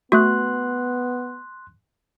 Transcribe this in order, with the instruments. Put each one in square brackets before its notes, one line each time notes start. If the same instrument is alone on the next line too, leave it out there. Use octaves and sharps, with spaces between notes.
[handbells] A3 F#4 [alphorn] B3 [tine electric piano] C6 F#6